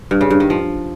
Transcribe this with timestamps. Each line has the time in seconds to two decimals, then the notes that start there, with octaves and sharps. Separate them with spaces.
0.11 G2
0.21 C#3
0.30 G2
0.40 D#3
0.50 F3